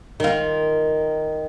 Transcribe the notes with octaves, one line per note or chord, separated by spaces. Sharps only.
D#3 F4